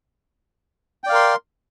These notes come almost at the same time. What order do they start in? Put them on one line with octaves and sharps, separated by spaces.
G5 D5 F5 A#4 C6